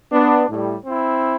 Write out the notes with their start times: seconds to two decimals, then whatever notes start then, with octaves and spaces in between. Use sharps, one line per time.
0.12 B3 D4
0.48 A2 G3
0.85 C4 E4